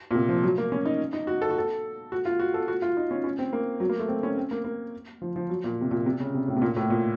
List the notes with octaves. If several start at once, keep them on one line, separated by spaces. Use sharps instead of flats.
A#2
C3
F3
F#3
A#3
C#4
D#4
D#4
F#4
A4
F#4
A4
F#4
F4
F#4
A4
F#4
F4
D#4
C#4
C#4
C4
A#3
F#3
A#3
A3
C4
C#4
C4
A#3
A#3
F3
F3
F#3
A#2
C3
A#2
C3
C#3
C3
A2
C3
A#2
A2
A#2